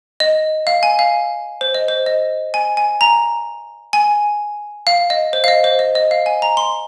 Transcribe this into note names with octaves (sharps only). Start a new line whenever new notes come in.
D#5
F5
G#5
F5
C5
D#5
C5
D#5
G#5
G#5
A#5
G#5
F5
D#5
C5
F5
D#5
C5
D#5
D#5
F5
G#5
A#5
C6